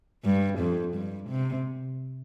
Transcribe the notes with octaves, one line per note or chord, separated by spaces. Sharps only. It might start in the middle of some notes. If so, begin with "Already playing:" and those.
G2
F2
G2
C3